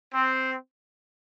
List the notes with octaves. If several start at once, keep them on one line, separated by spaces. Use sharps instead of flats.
C4